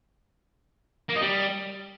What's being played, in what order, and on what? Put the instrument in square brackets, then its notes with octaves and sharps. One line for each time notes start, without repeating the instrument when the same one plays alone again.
[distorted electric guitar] A#3
D#4
G3